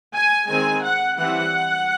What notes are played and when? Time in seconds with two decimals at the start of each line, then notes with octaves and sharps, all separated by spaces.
0.14 G#5
0.49 D#3 G#3 C4 G#5
0.83 F#5
1.17 E3 G3 C4 F#5